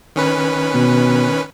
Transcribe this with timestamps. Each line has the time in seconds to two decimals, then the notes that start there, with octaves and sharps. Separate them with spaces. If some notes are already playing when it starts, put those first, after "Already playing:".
0.16 D#3 C#4 B4
0.74 B2